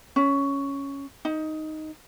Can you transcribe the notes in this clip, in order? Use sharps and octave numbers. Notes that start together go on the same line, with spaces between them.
C#4
D#4